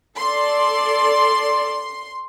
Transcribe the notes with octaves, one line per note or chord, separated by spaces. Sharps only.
A4 D5 C6